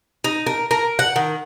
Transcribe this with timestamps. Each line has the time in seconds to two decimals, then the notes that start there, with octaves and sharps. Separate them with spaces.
0.24 D#4
0.46 A#4
0.71 A#4
0.99 F#5
1.16 D#3